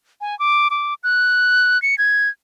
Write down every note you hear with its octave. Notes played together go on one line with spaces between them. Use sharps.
G#5
D6
D6
F#6
C#7
G#6